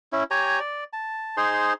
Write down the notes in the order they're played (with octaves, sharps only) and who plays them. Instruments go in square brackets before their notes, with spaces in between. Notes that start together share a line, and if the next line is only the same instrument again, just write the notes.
[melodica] C#4 E4
G4 C#5 G#5 A#5
D5
A5
D#4 G#4 C5 C6